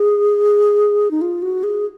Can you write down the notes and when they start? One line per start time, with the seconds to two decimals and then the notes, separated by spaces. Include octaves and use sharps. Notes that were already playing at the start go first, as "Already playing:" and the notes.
Already playing: G#4
1.11 D#4
1.21 F4
1.42 F#4
1.63 G#4